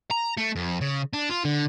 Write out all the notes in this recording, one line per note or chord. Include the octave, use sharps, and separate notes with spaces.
A#5
A3
F2
C#3
D4
F4
D3